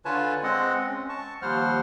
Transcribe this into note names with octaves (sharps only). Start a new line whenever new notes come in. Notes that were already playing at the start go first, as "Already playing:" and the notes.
D3 F4 B4 C#5 G#5 A5
G#3 C4 D#5 F#5
C#4
A5 C#6
D#2 F3 G3 C5 F#5 F6